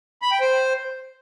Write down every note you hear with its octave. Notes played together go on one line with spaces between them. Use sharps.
B5
G5
C5